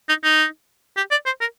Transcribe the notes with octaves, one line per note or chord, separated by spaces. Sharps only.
D#4
D#4
G4
D5
C5
A#4